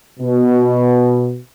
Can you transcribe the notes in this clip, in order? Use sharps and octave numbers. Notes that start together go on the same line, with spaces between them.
B2